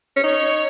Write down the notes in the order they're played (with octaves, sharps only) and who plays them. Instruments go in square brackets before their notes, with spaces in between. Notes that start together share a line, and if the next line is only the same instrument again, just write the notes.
[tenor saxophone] C#4
[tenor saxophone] D#4 [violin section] C#5